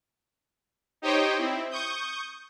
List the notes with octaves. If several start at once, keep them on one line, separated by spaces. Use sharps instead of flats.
D#4 G4 C5 C#5 D#5 G5
C4 E4
C#6 D#6 G6